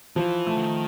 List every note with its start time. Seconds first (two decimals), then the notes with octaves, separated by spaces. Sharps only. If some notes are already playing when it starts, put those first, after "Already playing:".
0.16 E3 F3
0.47 A3
0.57 D3
0.63 D#3